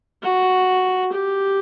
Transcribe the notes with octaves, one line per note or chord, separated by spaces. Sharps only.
F#4
G4